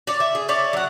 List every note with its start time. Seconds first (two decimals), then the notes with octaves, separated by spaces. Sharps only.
0.07 C#5 D5
0.20 E5
0.35 G#4
0.49 E4 C#5 D5
0.73 F#3 F#5